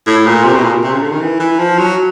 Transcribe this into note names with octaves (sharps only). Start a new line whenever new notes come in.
A2
A#2
C3
B2
A#2
C3
C#3
D3
D#3
E3
E3
F3
F#3